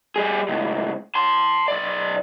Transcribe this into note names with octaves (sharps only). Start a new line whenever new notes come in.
G3 G#4
C#2 A2
A5 C6
B1 D5